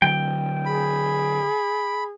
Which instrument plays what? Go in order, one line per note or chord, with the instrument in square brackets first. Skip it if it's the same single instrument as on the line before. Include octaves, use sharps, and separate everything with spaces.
[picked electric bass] D3 F#3 [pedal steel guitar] G5
[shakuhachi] G#4 [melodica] B5